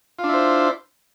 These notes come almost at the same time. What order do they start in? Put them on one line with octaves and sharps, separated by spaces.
F4 D4 E4 C5